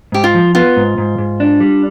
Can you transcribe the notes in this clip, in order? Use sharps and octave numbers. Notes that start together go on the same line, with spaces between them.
G#2 G4
F4
F3
B3 F4
G#2
G#2
G#2
D4
G3